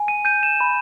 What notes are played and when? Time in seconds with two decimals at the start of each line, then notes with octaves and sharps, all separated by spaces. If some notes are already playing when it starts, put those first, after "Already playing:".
Already playing: G#5
0.08 D#7
0.25 G6 D#7
0.43 E7
0.60 B5